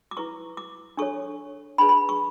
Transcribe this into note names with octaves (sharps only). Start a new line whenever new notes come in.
D6
E4 B4 C#6
D6
D4 A4 C#5 C#6
D4 G#4 B4 B5
B5
C#6